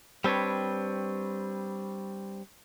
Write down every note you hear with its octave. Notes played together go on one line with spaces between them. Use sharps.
G3 C4 D4 B4 C#5